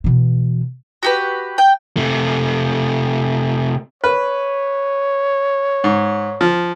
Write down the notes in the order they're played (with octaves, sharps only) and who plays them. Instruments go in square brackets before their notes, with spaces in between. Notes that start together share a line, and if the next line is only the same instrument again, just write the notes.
[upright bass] B2 E3
[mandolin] F#4 G4 B4
G5
[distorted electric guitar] C3 A3
[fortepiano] B4 [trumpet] C#5
[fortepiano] G#2
F3